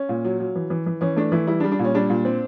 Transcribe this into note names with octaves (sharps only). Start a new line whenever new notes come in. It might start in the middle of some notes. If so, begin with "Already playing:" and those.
Already playing: C#4
A#2
F#3
F#3
E3
E3
E3
E3 C#4
A3 D4
E3 E4
G3 E4
D4
G3
D4
A#2 C#4
G3 D4
A#2
C4